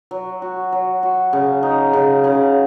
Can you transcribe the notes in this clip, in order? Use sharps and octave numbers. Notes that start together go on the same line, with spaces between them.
F#3
F#4
F#3
F#4
C#3
D#4
C#3
C#3